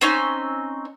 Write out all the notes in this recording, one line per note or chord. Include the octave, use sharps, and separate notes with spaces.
C4 C#4 D#4